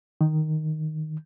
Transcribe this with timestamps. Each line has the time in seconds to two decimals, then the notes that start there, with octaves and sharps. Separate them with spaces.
0.21 D#3